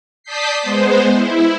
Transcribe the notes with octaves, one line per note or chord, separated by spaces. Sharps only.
D5 A5 D#6 G6 B6 C7
G#3 B3 C5
E4